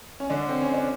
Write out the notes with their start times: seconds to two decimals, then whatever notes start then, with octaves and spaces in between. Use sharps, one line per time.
0.20 C#4
0.30 D3 D4
0.49 C4
0.62 C#4
0.74 D4